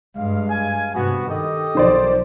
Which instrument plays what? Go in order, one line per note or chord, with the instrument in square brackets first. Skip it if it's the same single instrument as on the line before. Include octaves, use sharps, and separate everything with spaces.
[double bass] G2 G#3 [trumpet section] F5
[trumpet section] F5 G#5
[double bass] G2 C3 [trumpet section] B3 F#4
[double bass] D#3 [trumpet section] G4 A4 D#5
[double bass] B1 F3 [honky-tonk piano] D#3 C5 D5